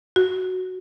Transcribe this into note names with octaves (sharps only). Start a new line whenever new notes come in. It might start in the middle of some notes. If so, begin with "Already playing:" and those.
F#4